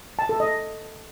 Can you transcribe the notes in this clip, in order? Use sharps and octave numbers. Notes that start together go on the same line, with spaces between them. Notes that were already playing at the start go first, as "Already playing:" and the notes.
A5
A4
D#5